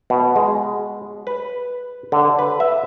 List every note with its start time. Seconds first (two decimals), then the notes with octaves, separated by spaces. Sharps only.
0.10 B2
0.36 G#3
1.27 B4
2.12 D3
2.39 B4
2.60 E5